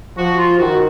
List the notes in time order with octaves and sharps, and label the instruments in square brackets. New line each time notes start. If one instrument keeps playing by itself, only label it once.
[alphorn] F3 [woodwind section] F#4
[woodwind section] F4
[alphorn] D#3 [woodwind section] F#4